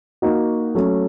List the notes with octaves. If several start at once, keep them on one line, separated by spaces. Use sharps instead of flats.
A#3 D#4 F#4
F#3 A3 C#4